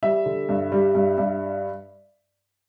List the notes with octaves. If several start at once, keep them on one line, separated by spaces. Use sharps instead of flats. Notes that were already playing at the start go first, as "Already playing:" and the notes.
G3 E5
D3
G2
G3
G2
G2